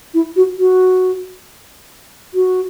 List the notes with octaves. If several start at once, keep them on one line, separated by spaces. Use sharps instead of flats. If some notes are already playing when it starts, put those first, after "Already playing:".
E4
F#4
F#4
F#4